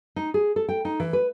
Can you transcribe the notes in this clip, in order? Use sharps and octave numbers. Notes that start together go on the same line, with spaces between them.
D#4
G#4
A4
G5
D#4
E3
B4